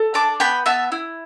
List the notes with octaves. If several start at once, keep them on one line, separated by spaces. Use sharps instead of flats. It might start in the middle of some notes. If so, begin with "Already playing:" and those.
Already playing: A4
D4 A5 D6
B3 G5 B5
B3 E5 A5
E4